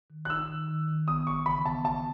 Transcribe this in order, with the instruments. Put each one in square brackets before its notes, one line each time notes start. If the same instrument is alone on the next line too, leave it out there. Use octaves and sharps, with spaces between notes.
[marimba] D#3
[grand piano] F#6
[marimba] D#4 [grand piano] E6
[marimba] D#3
D#3
D#3
[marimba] B3 [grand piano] D#6
[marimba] E3 [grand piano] C#6
[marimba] C#3 [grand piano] B5
[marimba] B3 [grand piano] A5
[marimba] B3 [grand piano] A5